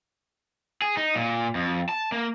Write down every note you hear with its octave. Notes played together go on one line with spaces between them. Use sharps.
G#4
D#4
A#2
F2
A5
A#3